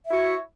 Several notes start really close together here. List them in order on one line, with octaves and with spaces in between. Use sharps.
E5 E4 F#4 C#5